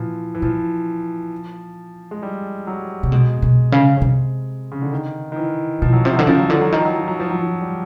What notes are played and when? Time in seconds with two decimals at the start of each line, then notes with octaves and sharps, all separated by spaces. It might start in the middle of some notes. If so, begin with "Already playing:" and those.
Already playing: A#2 E3 F3
0.35 E3
0.42 A#2 F3
2.11 G#3
2.23 G3
2.67 F#3
3.03 C3
3.12 B2 G#3
3.42 B2
3.72 C#3
4.02 C3
4.72 C#3
4.82 D3
4.92 D#3
5.32 D#3
5.36 E3
5.82 B2 F3
5.93 F#3
6.05 C3 F3
6.16 D3 F#3
6.27 C#3 F3
6.39 F#3
6.50 D3 F3
6.61 F#3
6.72 D#3 F3
6.85 F#3
6.96 F3
7.08 F#3
7.20 F3
7.31 F#3
7.42 F3
7.61 G3